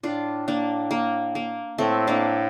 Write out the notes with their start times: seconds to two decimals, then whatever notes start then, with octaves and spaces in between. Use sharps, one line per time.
0.03 A2 D4 F4
0.48 A#3 D4
0.91 A#3
1.35 A#3
1.78 A2 A3 C4
2.07 A#3 D4